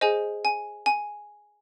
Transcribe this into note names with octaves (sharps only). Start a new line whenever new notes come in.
G#4 C5 D#5 G#5
G#5
G#5